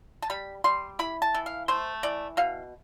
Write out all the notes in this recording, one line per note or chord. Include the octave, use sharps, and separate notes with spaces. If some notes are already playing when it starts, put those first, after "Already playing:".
A5
G3 B5
G3 C6
E4 B5
A5
E3
F5
A3 C5
E3 D5
B2 F5